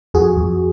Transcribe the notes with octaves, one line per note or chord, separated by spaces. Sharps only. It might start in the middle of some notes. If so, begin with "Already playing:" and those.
F2 F#4 G#4
F2